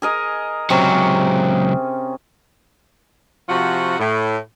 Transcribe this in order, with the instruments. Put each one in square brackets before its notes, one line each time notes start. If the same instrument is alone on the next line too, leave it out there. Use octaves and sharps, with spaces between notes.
[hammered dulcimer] G#4 A#4 D#5
[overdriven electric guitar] C#2 F#3 [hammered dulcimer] C3 C#4
[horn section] C3 F3 F4 F#4
A2